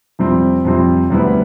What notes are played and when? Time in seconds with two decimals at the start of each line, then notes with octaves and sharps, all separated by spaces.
0.19 F2 C3 G3 C4
0.65 F2 C3 G3 C4
1.10 D2 C3 G3 B3 E4